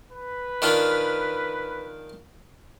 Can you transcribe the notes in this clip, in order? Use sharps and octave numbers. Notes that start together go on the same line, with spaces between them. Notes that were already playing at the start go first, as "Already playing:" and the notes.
B4
D#3 D4 F4